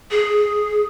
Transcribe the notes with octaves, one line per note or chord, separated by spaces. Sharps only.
G#4